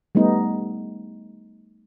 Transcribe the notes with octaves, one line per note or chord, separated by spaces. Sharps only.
G3 A3 B3 D#4